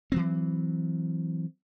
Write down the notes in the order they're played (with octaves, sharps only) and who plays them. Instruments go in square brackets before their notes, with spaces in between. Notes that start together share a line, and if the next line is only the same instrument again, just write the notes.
[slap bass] E3 F#3 C4